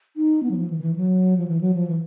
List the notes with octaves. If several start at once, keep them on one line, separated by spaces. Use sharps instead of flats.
D#4
B3
F#3
F3
E3
D#3
E3
F#3
F3
E3
F#3
F3
E3